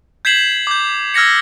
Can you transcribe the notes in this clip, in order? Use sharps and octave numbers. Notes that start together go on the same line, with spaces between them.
G6 G#6 B6 C7 E7 F#7
D6 G6
E6 F6 G#6 A#6 C#7